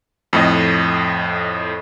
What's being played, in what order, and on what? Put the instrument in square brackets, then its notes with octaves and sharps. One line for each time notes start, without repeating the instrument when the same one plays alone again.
[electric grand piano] F2 A2 D#5